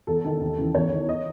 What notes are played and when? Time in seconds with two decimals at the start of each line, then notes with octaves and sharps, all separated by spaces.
0.07 E2 A4
0.25 D#3
0.41 D#2
0.58 C#3 E3
0.75 E2 C#5
0.92 D#3
1.09 D#5